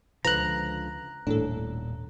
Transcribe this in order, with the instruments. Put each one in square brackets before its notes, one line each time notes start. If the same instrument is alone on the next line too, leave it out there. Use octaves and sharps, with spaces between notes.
[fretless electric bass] C#2 D3 F3 [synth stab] B4 [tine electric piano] A#5 F#6
[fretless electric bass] D#1 [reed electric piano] A2 [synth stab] D4 A4